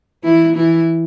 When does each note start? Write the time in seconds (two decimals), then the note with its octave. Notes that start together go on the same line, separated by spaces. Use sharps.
0.24 E3 E4
0.55 E3 E4